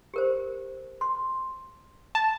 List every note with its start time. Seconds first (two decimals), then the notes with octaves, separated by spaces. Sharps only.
0.14 G4 A#4 C5
1.01 C6
2.15 A5